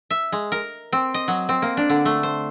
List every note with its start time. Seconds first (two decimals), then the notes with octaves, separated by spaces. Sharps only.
0.10 E5
0.32 G#3
0.52 A#4
0.93 C4
1.14 D#5
1.28 F#3
1.49 C4
1.62 A#3
1.77 D4
1.90 D3
2.05 A3
2.23 C5